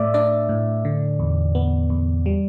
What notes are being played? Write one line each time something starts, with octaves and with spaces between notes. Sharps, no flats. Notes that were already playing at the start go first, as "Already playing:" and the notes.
Already playing: A2 A3 D5 E5
D4 D5
A2
D3
E2
B3
E2
G3